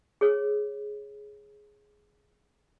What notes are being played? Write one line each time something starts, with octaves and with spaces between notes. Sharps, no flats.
G#4 C#5